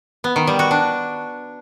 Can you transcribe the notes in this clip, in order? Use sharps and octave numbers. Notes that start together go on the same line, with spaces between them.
B3
D#3
G3
F#4
D4